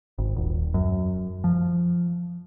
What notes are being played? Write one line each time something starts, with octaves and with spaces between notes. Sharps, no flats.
G#1
D#1
F#2
F3